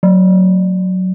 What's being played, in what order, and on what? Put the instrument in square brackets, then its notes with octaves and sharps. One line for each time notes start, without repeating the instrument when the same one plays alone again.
[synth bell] F#3